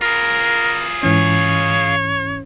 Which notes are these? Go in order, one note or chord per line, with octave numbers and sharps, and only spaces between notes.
F4 G#4 A#4
G#2 E3 C#4 C#5